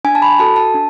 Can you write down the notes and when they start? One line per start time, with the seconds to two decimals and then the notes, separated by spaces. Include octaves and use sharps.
0.05 D4 G#5
0.15 A5
0.22 B5
0.39 F#4 A4 A5
0.56 A5
0.74 D4